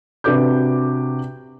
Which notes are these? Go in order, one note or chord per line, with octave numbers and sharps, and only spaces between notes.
C3 D4 F#4 B4 D6 G6